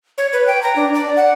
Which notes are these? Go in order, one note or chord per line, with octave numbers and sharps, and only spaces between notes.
C#5
B4
G5
A#5
D4
D5
F#5